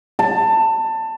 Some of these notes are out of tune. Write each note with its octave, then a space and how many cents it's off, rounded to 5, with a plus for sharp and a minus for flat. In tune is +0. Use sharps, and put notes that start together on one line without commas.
A5 +20